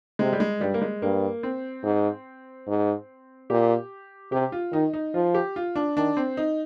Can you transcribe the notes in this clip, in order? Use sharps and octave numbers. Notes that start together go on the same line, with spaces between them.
C3 G#3
G3
G#3
G2 G3
A#3
G#3
G2 A#3
C4
G#2
G#2
A#2 G4
C3 G4
F4
D#3 D#4
D#4
F3 F4
G4
F4
D4
D#3 D4
C4
D#4